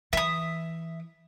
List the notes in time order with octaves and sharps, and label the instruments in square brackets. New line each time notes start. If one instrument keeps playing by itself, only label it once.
[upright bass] E3 [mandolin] E5 D#6